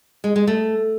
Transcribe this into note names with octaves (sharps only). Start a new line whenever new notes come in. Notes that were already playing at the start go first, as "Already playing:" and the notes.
G#3
G#3
A3